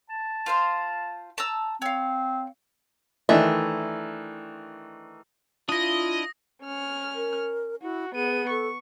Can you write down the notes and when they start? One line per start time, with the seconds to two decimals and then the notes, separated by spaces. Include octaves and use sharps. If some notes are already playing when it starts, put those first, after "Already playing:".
0.10 A5
0.46 F4 C5 F5
1.38 A5 A#5 E6
1.82 C4 C#5 F5
3.29 D#3 E3 A3 D4 D#5 E5
5.69 D4 E4 F4 D#5 D#6 A#6
6.63 C#4 F6
7.15 A#4
7.82 E4 F#4
8.15 B3 G#4 D#7
8.50 A4 C#6